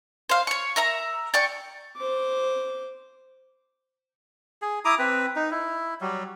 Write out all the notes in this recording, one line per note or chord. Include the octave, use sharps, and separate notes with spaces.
C5 F5
C#5 C#6
A#4 E5 A#5
D5 G5 C#6
C5 D6
G#4
E4 A#5 D6 D#6
C4 B4
D#4
E4
F#3 G3